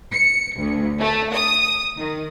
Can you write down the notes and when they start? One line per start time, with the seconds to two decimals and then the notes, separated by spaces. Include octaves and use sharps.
0.12 C#7
0.58 D2
0.99 A3
1.33 D#6
1.97 D#3